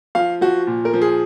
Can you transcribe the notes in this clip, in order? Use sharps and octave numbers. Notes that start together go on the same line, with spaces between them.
F3 F5
F3 F#4
A#2
A#4
F3
G#4